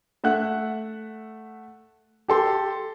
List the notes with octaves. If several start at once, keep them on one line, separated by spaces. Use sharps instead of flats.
A3 E5 F#5 F#6
G4 A4 C6